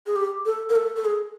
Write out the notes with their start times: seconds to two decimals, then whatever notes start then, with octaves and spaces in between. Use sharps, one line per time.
0.06 G#4
0.16 G4
0.45 A4
0.69 A#4
0.75 A4
0.96 A4
1.05 G#4